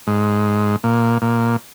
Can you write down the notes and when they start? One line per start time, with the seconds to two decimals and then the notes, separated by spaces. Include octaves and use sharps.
0.07 G#2
0.84 A#2
1.22 A#2